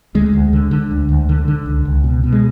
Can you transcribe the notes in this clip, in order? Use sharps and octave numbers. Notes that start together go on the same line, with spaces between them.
D2 G#3
D2
D3
D3
D2
D2
D3
D3
C#2
C#2
B2
B2
G#3